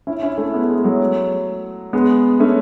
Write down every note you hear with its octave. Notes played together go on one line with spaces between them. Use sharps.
C#4 E4
C#4 E4
A3 C#4
G#3 B3
G#3
F#3 A3
G#3 B3
A3 C#4